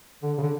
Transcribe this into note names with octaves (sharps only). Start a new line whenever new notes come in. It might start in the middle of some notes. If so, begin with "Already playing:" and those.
D3
C#3
D3